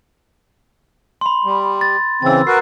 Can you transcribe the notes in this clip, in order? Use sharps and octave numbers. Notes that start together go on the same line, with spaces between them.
B5 C6
G3
A6
C#3 E3 C4 E6 A6
F#4 A#4 B4 C7